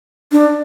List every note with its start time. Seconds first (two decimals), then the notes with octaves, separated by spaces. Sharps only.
0.32 D4